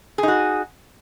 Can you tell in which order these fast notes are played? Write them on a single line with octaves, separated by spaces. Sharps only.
G#4 D#4 F#4